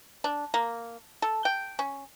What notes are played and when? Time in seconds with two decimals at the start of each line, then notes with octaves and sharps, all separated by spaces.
0.24 D4
0.54 A#3
1.22 A4
1.45 G5
1.79 C#4